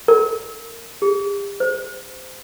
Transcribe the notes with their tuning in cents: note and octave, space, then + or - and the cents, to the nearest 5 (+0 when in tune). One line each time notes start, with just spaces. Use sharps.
A#4 -25
G4 +40
C5 -20